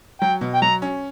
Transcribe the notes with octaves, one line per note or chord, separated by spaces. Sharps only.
F#3 G5
B2
G5
F#3 A#5
C#4